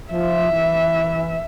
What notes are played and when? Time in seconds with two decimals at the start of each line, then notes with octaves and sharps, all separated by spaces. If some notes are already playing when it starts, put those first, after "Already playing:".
0.12 F3 E5
0.52 E3